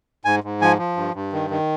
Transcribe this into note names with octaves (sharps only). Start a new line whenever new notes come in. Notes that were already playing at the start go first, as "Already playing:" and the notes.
G#2 G#5
G#2
F3 G#5
F3
G2
G2
D#3
D#3